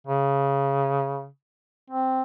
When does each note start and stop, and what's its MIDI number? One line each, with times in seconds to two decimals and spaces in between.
0.07 1.27 49
1.90 2.23 60